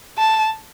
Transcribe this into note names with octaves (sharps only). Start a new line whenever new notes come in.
A5